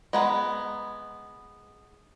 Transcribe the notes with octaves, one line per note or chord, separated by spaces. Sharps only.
G#3 B3 A#5